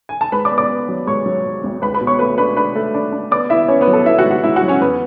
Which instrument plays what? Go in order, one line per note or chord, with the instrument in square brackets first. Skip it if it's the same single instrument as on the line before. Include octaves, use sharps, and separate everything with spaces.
[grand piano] G#5
A5
G#2 B4 B5
D5 D6
B3
D5 D6
B3
F#3
G#2 C#5 C#6
F#3
G#2
G#1
C#2 B4 B5
B4 B5
B2
C#5 C#6
A3 B4 B5
D4 B4 B5
D4 B4 B5
A3
D4
D4
B3 D5 D6
B3 E4 E5
B3 C#4 C#5
B3 B4
F#3
A4
B3 E4 E5
F#4 F#5
G#2
F#4 F#5
G#2 E4 E5
F#4 F#5
F#3
C#4 C#5
E2 B3 B4